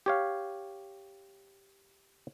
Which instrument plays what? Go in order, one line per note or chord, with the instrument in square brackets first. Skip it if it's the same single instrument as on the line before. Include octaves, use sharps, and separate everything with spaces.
[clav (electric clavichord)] G4 C#5 F5